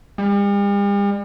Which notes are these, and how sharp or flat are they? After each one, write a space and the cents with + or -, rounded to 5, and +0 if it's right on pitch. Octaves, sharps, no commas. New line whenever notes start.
G3 +45